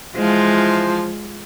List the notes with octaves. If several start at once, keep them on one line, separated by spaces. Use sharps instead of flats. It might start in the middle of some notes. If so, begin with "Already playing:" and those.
E3 F3 G#3 F4 C5